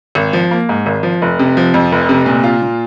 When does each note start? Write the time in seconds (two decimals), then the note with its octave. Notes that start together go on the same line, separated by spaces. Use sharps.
0.15 G#1
0.33 F3
0.51 A#3
0.69 G#2
0.86 G#1
1.03 F3
1.22 F1
1.39 C3
1.57 F3
1.74 F2
1.92 F1
2.09 C3
2.26 A#2
2.44 F4
2.62 A#2